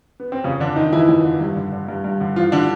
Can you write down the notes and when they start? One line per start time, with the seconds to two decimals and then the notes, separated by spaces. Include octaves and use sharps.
0.20 B3
0.32 C4
0.44 F2 C#3 C#4
0.60 D3 D4
0.76 D3 D#3 D#4
0.92 F2 E3 E4
1.09 F2
1.25 D3
1.40 G2
1.56 D3
1.72 D3
1.88 G2
2.04 G2
2.20 D3
2.36 E3 F3 F4
2.52 D3 D4